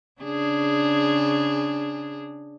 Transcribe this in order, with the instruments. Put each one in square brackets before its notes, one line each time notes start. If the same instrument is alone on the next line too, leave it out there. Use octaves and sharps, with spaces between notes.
[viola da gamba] C#3 D4 G#4